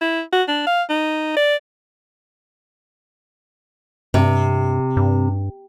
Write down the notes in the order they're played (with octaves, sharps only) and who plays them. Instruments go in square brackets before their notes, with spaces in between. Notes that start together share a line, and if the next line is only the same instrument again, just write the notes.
[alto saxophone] E4
F#4
D4
F5
D#4
D5
[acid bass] G2 [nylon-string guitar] C3
[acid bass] G2